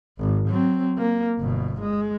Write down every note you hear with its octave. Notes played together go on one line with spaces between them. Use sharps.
G#1
F#3 C4
A#3
G1 B2
G#3